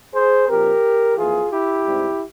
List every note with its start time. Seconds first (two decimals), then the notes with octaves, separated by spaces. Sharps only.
0.14 G#4 C5
0.48 A#2 F3 C4 G4 A#4
1.17 F2 E3 A#3 F4 G#4
1.51 E4 G4
1.85 G#2 G3 C4